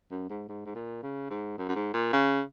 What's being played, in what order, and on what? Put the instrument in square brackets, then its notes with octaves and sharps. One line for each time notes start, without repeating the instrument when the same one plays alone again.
[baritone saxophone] F#2
G#2
G#2
G#2
A#2
C#3
G#2
F#2
F#2
G#2
A#2
C#3